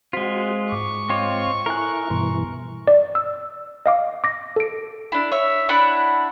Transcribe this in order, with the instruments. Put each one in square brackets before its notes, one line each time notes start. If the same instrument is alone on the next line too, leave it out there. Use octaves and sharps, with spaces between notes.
[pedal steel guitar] G#3 F4 [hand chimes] C4 C5 B6 [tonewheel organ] F#4
[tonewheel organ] G#2 [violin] C#6 [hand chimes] D6
[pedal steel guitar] C4 F4 C#5 [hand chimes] D#5 D6
[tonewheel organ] E4 [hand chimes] A4 G#5 [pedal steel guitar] A#4 F#6
[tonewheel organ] G2 B2 E3 [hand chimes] C6
[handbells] D5
E6
D#5 F5 D6
D6 A#6
A4 D7
[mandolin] D4 E4
C#5 E5
D4 E4 F#5 B5